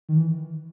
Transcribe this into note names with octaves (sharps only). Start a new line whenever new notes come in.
D#3
E3